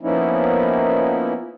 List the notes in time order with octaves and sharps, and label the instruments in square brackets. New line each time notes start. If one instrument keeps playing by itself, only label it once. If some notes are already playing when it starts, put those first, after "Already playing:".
[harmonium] F3 A#3 B3 C#4 D#4 E4